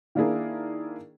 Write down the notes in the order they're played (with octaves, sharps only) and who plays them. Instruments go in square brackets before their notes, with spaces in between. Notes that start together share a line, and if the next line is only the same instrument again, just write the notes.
[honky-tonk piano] D#3 A#3 D4 E4 G#4 A#4